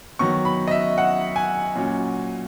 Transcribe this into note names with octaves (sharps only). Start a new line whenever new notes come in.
D#3 F#3 B3 C#6
B5
D#5
E5
F#5
G#5
A#2 F#3 C#4